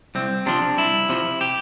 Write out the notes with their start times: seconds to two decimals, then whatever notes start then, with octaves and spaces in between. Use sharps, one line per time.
0.15 C2 C4
0.46 C3 F3 D4
0.78 C2 E4
1.09 C3 F3
1.41 G4